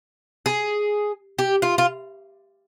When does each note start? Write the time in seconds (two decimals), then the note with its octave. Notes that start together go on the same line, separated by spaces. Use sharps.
0.46 G#4
1.39 G4
1.62 F4
1.78 F4